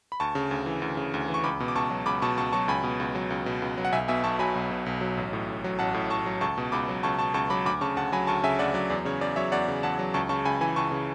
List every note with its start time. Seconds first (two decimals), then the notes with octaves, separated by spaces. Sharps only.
0.12 B5
0.20 D2 A5 C#6
0.35 C#3
0.51 D2
0.66 E3
0.82 D2
0.97 C#3
1.14 D2
1.28 E3
1.34 C#6
1.44 C#2 B5 D6
1.60 B2
1.68 D6
1.75 C#2 A5 C#6
1.90 F#3
2.06 C#2 B5 D6
2.22 B2 A5 C#6
2.38 C#2 A5 C#6
2.52 F#3 A5 C#6
2.68 C#2 G#5 B5
2.83 B2
3.00 C#2
3.15 F#3
3.30 C#2
3.46 B2
3.62 C#2
3.78 F#3
3.85 F#5
3.93 B1 E5 G#5
4.08 B2 E5 G#5
4.24 B1 A5 C#6
4.39 F#3 G#5 B5
4.55 B1
4.71 B2
4.86 B1
5.01 F#3
5.17 A1
5.33 A2
5.48 A1
5.64 F#3
5.79 A1 F#5 A5
5.94 A2
6.10 A1 A5 C#6
6.26 F#3
6.41 C#2 A5 C#6
6.58 B2
6.72 C#2 B5 D6
6.89 F#3
7.03 C#2 A5 C#6
7.19 B2 A5 C#6
7.34 C#2 A5 C#6
7.50 F#3 B5 D6
7.65 D2 B5 D6
7.81 C#3 A5 C#6
7.96 D2 F#5 A5
8.12 F#3 G#5 B5
8.27 D2 A5 C#6
8.43 C#3 E5 G#5
8.59 D2 D5 F#5
8.74 F#3 D5
8.90 E2 D5
9.05 C#3 C#5
9.21 E2 D5
9.36 F#3 C#5 E5
9.52 E2 D5 F#5
9.68 C#3
9.83 E2 F#5 A5
9.99 F#3
10.14 C#2 A5 C#6
10.29 C#3 A5 C#6
10.45 C#2 G#5 B5
10.61 E3 G#5 B5
10.76 C#2 A5 C#6
10.92 C#3